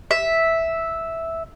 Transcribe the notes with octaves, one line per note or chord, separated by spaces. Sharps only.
E5